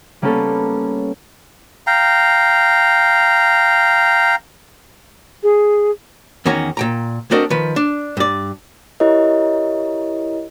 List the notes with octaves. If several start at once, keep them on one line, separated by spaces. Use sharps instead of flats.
G3 A#3 B3 C#4 A4
F5 G5 A#5
G#4
E2 D#3 C#4 F#4 A#5
A#2 G5 A#5
A3 C4 D4 F#4 A#4 D#5
D#3 F3 B4
D4
G2 D5
E4 G4 A#4 C#5 D#5